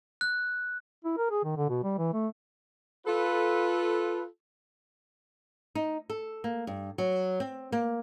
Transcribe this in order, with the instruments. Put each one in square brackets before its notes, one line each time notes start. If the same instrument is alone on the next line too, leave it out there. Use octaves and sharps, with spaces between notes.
[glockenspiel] F#6
[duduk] E4
A#4
G#4
D#3
D3
B2
G3
E3
A3
[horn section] F4 A4 B4
[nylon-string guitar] D#4
A4
A#3
G2
F#3
C4
A#3